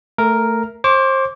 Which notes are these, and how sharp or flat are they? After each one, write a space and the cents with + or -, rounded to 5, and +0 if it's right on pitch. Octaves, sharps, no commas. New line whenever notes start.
A3 +15 A#4 +0
C5 +30 D6 -25